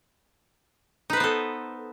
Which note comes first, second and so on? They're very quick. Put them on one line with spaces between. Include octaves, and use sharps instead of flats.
D#4 B4 C5 B3 A4